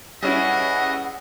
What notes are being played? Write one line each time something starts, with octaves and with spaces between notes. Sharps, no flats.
G3 C#4 E4 G#4 B4 D#5 E5 F#5